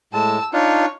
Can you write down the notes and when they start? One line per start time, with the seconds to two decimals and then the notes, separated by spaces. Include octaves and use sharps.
0.13 A2 G#3 A5 E6
0.53 D4 D#4 F4 C#5